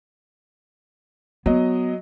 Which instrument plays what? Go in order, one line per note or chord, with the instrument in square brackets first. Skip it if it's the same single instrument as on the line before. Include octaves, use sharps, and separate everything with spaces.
[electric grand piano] F#3 D#5 [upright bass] B3